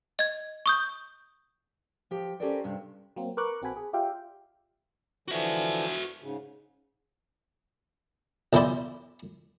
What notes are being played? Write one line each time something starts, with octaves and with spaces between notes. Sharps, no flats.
D#5 G#6
C#6 D#6 G6
F3 G4
C#4 G4 A4 A#4 C5 D5
G2 C3
F#3 A#3 C4
A#4 B4 C#6 D6 F#6
A#1 C4 F#4 A4 G#5 B5
G#4
F4 G4 D5 E5 F5 G5
D3 E3 F3 F#4 E5
G#2 C#3
B1 E3 E4 C5 D5